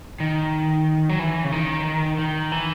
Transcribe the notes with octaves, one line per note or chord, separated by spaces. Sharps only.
D#3
F#3
E3
C#3
D#3
D#3
E3